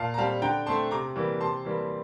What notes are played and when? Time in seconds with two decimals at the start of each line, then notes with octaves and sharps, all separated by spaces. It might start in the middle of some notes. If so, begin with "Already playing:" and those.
Already playing: A#2 F5 A5
0.14 A#5
0.18 G3 C4 F5 A5
0.42 D3 G5 A#5
0.66 A3 C4 A5 C6
0.91 C3 A#5 D6
1.16 E3 G3 A#3
1.41 C3 A5 C6
1.65 E3 G3 A#3